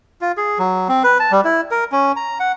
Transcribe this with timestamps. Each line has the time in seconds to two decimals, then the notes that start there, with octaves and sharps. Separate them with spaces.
0.21 F4
0.37 G#4
0.59 F#3
0.89 C4
1.04 B4
1.20 A5
1.32 G3
1.44 E4
1.71 A#4
1.92 C#4
2.16 A#5
2.40 F#5